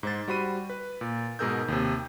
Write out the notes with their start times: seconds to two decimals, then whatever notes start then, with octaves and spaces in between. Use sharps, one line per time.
0.03 G#2 C5 A6
0.28 G3 F#4 C5 B5 D#7
0.70 B4
1.01 A#2
1.39 G#2 B2 G#4 A#4 E6 G6
1.68 D#2 C3